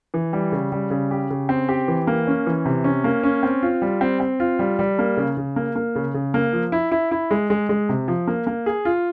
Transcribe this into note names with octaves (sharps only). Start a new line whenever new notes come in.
E3
G3
C#3
G3
C#3
G4
C#3
C4
G4
E3
A#3
C#4
E3
C3
C#4
A#3
C#4
C4
F4
G3
C4
C4
F4
G3
G3
A#3
C#3
C#3
A#3
A#3
C#3
C#3
A#3
F3
E4
E4
E4
G#3
G#3
G#3
C3
F3
A#3
A#3
G#4
F4